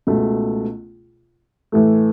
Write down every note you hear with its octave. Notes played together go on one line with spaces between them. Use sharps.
C#2 B2 A3
A2 E3 A3